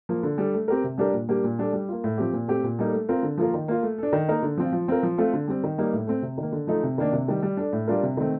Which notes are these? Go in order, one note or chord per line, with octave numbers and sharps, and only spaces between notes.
F3 A#3
D3
G3 D4 A4
A3
C4 G4 A#4
C3
G3 D4 G4 A#4
A#2
G3 A#3 D4 G4
A#2
G3 D4 A4
G3
A#3 F4
A2
F3 C4 G4
A#2
A3 C4 G4
A#2
G3 A#3 D#4 A4
A3
C4 F4 A#4
D3
F3 A#3 F4 A#4
D#3
A#3 F4
A3
D4 A4
D#3
A#3 D#4 A#4
D3
F3 C4 F4
F3
C4 F4 A#4
F3
A3 C4 F4 A4
D3
G3 C4
D#3
G3 A#3 D#4
A2
A3 C4
C3
D#3 A#3
D3
F3 A3 D#4 A4
C3
D#3 A#3 D4
C3
D#3 G3
G3
D4 A4
A2
G3 D4 F4 A#4
C3
D#3 A3 C4